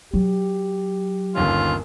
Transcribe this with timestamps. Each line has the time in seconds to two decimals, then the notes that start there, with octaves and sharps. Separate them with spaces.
0.14 F#3 G4
1.35 G1 D#2 C#4 F4